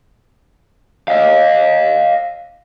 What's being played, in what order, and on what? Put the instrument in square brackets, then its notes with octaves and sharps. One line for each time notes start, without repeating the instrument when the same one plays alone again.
[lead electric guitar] D#5 F5